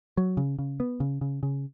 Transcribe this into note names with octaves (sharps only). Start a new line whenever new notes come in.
F#3
C#3
C#3
B3
C#3
C#3
C#3